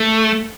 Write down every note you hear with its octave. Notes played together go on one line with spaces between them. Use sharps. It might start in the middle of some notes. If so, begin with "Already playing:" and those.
Already playing: A3